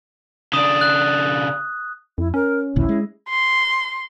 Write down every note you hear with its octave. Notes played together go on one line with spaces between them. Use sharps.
C#3 D4 D#6
F#6
F2 E4
C#4 A#4
A#1 D#2 A#2 E4
G#3
C6